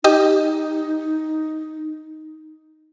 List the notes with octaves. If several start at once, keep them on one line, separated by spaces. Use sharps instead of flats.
D#4 G4 D#5